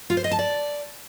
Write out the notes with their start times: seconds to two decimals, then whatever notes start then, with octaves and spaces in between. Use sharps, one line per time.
0.10 F4
0.17 C5
0.24 D#5
0.31 A5
0.39 D5